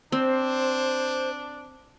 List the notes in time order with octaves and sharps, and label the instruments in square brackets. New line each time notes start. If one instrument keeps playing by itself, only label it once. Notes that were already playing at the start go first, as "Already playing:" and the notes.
[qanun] C4 [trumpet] D4 [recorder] C5